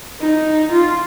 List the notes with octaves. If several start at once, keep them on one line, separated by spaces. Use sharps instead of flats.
D#4
F4